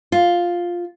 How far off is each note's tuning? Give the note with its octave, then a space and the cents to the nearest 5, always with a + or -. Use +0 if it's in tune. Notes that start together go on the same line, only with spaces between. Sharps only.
F4 +5